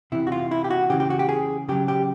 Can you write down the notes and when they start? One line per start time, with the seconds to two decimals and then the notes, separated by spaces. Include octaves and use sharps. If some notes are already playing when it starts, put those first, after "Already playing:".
0.12 C3 E3 E4
0.27 F#4
0.32 F4
0.51 E4
0.64 G4
0.70 F#4
0.90 C#3 E3 G4
1.00 G4
1.10 F#4
1.19 G4
1.29 G#4
1.69 C#3 F#3 G4
1.88 G4